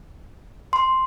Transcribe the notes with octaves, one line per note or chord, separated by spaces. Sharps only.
C6